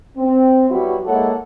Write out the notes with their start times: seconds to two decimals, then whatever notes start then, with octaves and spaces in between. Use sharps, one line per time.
0.17 C4
0.70 F#3 G3 B3 E4 F#4
1.06 G#3 A#3 E4 A4 C#5 F#5